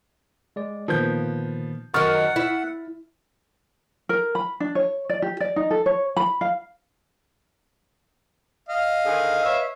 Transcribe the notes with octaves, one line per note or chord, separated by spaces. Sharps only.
G#3 D5
A#2 D#3 F3 B3 G6
F#2 D#3 F#5 C#6 F6 A6
E4
A#4
B5
D4
C#5
D5
G4
D5
D#4
A4
C#5
B5
F5
D#5 F5
D3 D#3 G#4
B4 C#5 E5